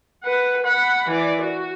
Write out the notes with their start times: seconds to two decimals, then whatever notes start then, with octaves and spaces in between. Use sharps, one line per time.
0.24 B4 F#5
0.64 F#5 B5
1.09 E3 D5
1.42 F#4